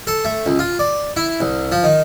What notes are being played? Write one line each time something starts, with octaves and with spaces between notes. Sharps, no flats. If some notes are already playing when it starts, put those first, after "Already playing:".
A4
A3
C#2
F4
D5
E4
C2
F3
D#3